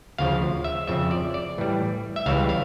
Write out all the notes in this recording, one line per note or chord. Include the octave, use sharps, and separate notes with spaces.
D2 C#3 F3 F5
E5
F2 C#3 F3 E5
D5
D5
A2 E3 G3
E5
C#2 C#3 E3 G3 F5
F5